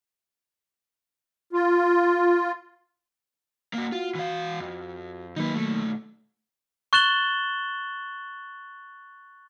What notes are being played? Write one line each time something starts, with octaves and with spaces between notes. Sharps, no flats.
F4
A#3 F#4
F4 F#4
E3 F5
F2
D#3 F#3 A#3 D#4 B4
B1 A3
C#6 F#6 A6 E7 F#7 G7